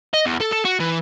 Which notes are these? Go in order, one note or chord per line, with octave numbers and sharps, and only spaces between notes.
D#5
E2
A4
A4
F#4
E3